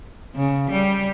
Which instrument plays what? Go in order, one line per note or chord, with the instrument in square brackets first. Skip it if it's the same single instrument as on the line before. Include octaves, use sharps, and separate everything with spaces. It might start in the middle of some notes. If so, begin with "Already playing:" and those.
[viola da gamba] C#3
G3